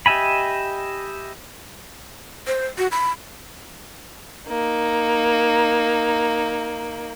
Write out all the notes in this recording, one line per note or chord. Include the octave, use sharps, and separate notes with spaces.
G4 D#5 E5 G#5 B5
C5
F#4
B5
A#3 D#4